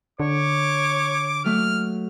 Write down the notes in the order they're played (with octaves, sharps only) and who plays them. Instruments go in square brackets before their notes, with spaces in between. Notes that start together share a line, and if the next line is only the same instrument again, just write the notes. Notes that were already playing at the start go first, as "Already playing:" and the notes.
[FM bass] D3 [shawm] C#5 [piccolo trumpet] D6
[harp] F#3 A3 [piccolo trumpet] F6